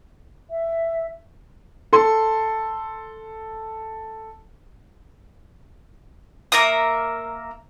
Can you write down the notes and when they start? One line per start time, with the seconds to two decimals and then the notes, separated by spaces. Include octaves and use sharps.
0.50 E5
1.93 A4 C6
6.52 A#3 A#4 E5 D#6